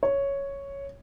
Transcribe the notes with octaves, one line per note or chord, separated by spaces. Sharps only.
C#5